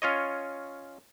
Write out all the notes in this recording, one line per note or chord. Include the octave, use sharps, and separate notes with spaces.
C#4 F4 C#5 D#5